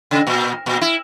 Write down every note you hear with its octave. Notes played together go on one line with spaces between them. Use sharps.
C#3
A#2
A#2
E4